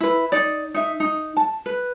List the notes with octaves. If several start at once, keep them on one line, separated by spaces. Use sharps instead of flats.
E4 B4
D#4 D5
D#4 E5
D#4
A5
B4